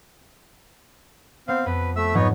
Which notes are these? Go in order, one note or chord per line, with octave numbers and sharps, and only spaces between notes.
B3 C4 C5 F5
F2 B4
A3 E5 E6
G#2 F3 F#3 B3 D#4 C#5